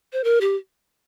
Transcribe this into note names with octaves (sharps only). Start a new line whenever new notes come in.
C5
A#4
G4